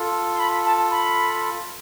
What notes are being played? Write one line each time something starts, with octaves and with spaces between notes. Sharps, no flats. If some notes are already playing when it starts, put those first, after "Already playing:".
Already playing: F4 A4
C6
B5
A5
B5